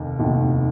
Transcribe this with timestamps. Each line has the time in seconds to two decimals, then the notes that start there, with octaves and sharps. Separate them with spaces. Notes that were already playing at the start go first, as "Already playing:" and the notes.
Already playing: F1 D#2 D#3
0.19 F1 D#2 D#3